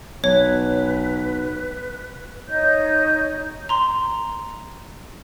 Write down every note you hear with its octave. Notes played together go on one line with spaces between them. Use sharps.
B1 B4 C#5
D#4 C#5 D#5 G6
A#5 C6